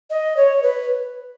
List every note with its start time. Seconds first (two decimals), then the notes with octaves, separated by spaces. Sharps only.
0.10 D#5
0.36 C#5
0.63 B4